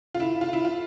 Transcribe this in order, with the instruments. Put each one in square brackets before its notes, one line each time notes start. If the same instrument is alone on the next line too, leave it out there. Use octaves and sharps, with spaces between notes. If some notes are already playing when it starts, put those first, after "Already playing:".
[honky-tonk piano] F4
E4
F4
E4
F4